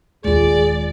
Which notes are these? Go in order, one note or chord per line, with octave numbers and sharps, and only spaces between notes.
D#1 D#2 G#3 F4 G#4 D5